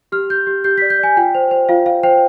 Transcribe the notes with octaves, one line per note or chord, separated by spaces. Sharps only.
G4 F6
G4 G6
G4
G4 G6
B6
D5
G6
D5 G#5
F4 G5
C5
C5
F4 F5
F4 F5
C5 G5